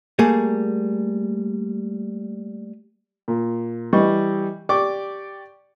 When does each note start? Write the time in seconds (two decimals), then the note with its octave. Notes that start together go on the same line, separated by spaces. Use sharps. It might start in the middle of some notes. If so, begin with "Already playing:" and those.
0.19 G3 A3 A#3 G#4
3.28 A#2
3.93 E3 G3 D#5 C#6
4.69 G4 D5 C#6 D6